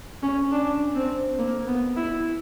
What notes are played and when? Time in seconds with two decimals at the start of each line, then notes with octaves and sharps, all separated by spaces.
0.23 C#4
0.51 D4
0.95 C4
1.38 A#3
1.67 B3
1.96 E4